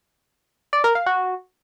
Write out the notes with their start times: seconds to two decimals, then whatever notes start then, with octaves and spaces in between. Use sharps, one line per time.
0.73 D5
0.84 A#4
0.95 F5
1.06 F#4